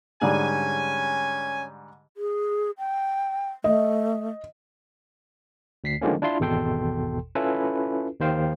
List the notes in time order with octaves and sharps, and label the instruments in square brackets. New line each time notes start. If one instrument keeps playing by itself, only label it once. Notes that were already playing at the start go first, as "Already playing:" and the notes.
[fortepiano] G#2 D3 G3 [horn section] C#4 G#5
[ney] G#4
G5
[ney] A3 [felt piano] D#5
[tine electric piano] D2 B6 C7
D3 D#3 F3 G#3 A#3 C#4
D4 E4 F4 C6
G#1 E2 B2 A4 G5 C6
C#4 E4 F4 A4 B4
D#2 D#3 C5 F5 G5